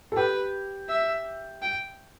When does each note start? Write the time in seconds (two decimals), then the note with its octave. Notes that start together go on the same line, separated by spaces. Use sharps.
0.12 A4
0.16 G4 B4
0.89 E5
1.62 G5